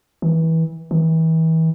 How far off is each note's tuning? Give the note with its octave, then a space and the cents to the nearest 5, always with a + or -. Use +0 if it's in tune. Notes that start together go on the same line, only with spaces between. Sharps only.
E3 -25
E3 -35